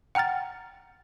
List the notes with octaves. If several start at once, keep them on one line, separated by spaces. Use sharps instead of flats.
F#5 G5 A#5 F6 A6